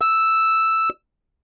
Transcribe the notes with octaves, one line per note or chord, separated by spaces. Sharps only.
E6